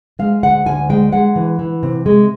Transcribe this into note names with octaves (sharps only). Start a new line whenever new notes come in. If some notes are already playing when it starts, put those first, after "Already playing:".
G#3 F5
D2 F#5
D2 G#5
G#3 G5
G#3 F#5
E3
E3
C3
G#3